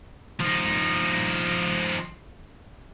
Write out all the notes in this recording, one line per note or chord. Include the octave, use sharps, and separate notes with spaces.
F3 D#4